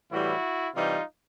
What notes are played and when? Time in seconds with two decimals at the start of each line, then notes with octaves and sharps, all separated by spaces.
0.11 A2 E3 G3 E4 F#4
0.74 C3 E3 G3 D#4 F4